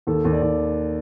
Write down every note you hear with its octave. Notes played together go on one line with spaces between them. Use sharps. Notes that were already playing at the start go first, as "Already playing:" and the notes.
D#2 A4
D#2
D5
D#2